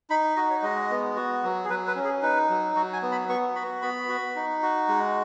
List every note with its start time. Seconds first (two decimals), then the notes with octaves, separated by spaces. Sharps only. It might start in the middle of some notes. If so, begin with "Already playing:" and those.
0.10 D#4 B5
0.36 F#4 D#5
0.50 C#5
0.63 G#3 D#5
0.90 B3
1.16 F#4
1.43 F#3
1.65 G#4
1.70 F#3 B4
1.87 B4
1.96 C#4
2.04 G#4
2.22 D#4 B4
2.50 F#3
2.75 F#3 F#4
2.93 G#5
3.02 B3
3.12 B5
3.29 B3 C#6
3.55 F#4 B5
3.82 B3 B5
4.09 F#4
4.36 D#4
4.62 F#4
4.88 G#3